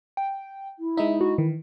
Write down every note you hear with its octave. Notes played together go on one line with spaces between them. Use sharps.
G5
E4
G#3 D#4 E5
F#4
D#3 E3